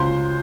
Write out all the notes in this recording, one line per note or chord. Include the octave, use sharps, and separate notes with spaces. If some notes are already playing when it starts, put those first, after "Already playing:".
Already playing: C#2 C5 C6